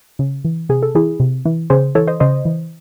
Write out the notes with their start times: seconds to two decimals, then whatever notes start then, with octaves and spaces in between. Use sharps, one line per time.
0.19 C#3
0.45 E3
0.69 C3 G#4
0.83 A4
0.95 E3 E4 G#4
1.20 C3
1.45 E3
1.70 C#3 G#4 C5
1.95 E3 A4 C#5
2.08 C5 D#5
2.20 C#3 C5 D#5
2.45 E3